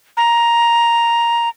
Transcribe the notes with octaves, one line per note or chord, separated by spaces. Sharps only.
A#5